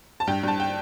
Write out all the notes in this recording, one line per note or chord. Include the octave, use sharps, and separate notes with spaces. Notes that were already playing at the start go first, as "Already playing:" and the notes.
A5
G2 G5
G2 A5
G5